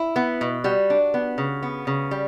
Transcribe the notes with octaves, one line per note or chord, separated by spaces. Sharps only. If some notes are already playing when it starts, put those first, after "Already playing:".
Already playing: E4
B3
B2
G3 F#4
D4
B3
C#3
B3
C#3
G3